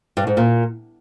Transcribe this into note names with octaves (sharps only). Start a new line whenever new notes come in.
G2
G#2
A#2